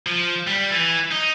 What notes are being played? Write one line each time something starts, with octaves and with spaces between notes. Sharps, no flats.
F3
G3
E3
D#4